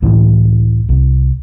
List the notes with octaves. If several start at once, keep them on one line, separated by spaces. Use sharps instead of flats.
C#2 A2 E3
C2